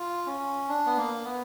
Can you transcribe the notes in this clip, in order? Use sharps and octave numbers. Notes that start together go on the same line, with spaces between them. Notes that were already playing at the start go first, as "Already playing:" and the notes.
Already playing: F4
C#4
D4
B3
A#3
B3